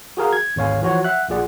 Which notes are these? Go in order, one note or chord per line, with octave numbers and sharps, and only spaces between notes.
F#4 G#4 A#4 F5
G#6
G#1 D2 C#5 F5 G#5
E3 F3 F#4 C#5
E5 F#5 F#6
A#1 A#2 F4 G#4 D5 F#5